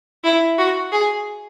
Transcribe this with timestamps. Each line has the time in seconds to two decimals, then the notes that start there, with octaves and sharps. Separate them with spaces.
0.24 E4
0.58 F#4
0.92 G#4